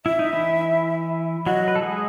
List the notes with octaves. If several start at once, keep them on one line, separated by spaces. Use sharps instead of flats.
E4 E5
D#4
E3 E4
F#3 F#4 D#5
B4
A4
G#3 G#4